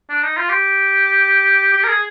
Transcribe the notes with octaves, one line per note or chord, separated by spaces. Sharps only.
D4
D#4
F4
G4
G4
A#4
G#4